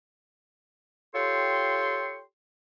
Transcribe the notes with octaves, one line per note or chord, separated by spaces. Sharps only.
F4 G4 A4 C#5 G5 C6